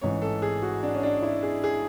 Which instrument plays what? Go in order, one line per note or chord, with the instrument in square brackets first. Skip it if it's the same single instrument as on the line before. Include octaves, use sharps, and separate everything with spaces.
[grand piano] A1 G#2 E3 C#5
A4
G#4
F#4
D4
C#4
D4
E4
G#4
G#4